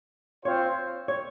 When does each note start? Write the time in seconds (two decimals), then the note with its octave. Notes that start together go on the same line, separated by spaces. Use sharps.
0.45 C4 F4 C5 C#5
1.08 C#5